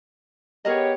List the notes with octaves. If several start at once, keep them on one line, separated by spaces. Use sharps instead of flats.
B3 G4 G#4 A#4 C#5 D#5